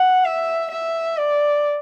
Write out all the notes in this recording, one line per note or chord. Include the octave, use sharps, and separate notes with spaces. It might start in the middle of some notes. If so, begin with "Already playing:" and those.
Already playing: F#5
E5
E5
D5